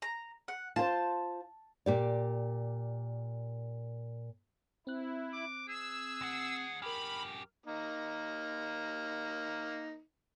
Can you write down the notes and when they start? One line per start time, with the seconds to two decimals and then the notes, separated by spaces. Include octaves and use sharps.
0.02 A#5
0.48 F#5
0.76 F4 C5 A5
1.86 A#2 G4 D5
4.87 C4 E4 F#6
5.33 D6
5.68 G#4 E6
6.21 D2 F#5
6.82 F#2 G4 A#4 B5 F6
7.66 A#3 D#4